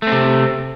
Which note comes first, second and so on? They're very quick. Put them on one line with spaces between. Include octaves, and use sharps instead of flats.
A3 C4 C3